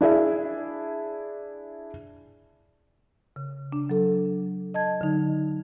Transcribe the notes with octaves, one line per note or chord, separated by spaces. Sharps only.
D4 E4 G#4 E5
C#3
D4
F#3 A4
D#5 A5 G#6
D3 F#3 D#4